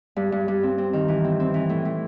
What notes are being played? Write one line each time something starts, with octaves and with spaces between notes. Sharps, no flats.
G2
G2
G2
C4
C4
D#3
E3
C4
C4
E3
A2
A2